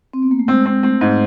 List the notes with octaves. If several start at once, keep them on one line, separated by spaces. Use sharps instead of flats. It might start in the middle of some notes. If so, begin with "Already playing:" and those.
C4
B3
A#3
A3
G#3 C4
C4
A3 C4
G#2